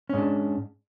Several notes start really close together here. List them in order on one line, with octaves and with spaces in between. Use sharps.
C#4 G#2 D4